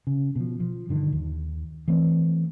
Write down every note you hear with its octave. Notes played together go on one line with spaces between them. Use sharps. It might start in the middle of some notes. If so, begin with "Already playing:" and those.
C#3
B2 F3
F3
G2 D3 D#3
D#2
E3 A3 C4